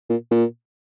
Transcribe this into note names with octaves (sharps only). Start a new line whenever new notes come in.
A#2
A#2